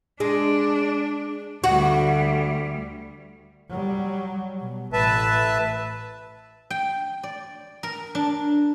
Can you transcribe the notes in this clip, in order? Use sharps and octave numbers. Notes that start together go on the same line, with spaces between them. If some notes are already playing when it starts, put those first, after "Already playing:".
G#3 D4
D2 G3 F#4
F#3 G3
B2
A1 B4 E5 A5
G5
D5
A#4
D4